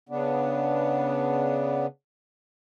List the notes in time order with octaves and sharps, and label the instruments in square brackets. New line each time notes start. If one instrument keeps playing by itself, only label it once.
[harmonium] C#3 B3 D4